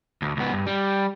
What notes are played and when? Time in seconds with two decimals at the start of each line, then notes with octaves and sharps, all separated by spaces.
0.22 D2
0.37 C#2 B3
0.53 G2
0.66 G3